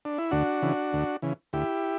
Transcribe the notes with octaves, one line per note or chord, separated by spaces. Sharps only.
D4
E4
D2 D4 F#4
C#3 E3
D2
C#3 E3
D2 E4 G4